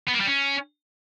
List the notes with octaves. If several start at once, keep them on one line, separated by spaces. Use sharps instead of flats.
B3
A#3
G3
C#4